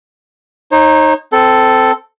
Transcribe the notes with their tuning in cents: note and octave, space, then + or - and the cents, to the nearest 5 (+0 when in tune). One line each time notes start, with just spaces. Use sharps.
D#4 +0 C#5 -45
C4 -15 A4 +0